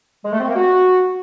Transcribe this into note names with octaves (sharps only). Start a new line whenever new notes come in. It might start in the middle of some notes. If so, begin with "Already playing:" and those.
G#3
A3
C4
A#3
F#4